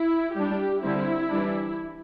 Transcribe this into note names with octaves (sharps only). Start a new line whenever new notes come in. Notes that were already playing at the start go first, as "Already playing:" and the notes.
Already playing: E4
G3 D4 G4
D3 G3 C4 E4
E3 G3 D4